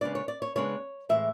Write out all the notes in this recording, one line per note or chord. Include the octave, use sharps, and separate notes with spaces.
C#3 G#3 B3 D4 D5
C#5
D5
C#5
C#3 G#3 B3 D4 C#5
A2 E3 G#3 E5